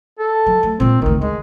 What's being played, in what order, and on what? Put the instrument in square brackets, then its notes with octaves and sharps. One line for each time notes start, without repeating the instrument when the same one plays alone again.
[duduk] A4
[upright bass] F#3
F#3 A3
[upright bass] A#2 G#3 [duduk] C4
[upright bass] A1 D2 [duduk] D#3
[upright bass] D#3 [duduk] G#3